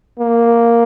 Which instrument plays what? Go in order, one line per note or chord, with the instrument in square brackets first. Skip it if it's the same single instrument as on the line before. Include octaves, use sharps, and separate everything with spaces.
[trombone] A#3